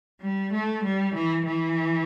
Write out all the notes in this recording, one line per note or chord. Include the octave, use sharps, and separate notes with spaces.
G3
A3
G3
E3
E3